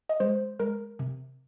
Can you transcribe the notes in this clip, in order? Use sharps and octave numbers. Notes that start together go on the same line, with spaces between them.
D#5
G#3 C5
G#3 A#4
C3